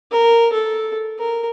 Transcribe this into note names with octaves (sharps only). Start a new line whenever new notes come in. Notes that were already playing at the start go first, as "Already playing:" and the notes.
A#4
A4
A#4